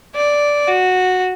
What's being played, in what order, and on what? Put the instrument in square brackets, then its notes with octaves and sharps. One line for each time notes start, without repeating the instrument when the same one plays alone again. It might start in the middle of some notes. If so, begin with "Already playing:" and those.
[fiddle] D5
F#4